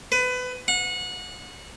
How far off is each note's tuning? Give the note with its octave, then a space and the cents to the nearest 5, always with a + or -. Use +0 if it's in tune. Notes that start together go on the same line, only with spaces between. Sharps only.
B4 +25
F#5 -30